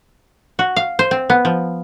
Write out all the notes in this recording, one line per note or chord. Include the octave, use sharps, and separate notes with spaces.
F#4
F5
C5
C4
B3
F3